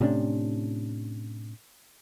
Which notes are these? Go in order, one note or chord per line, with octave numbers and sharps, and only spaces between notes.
A2 C3 C#4 D4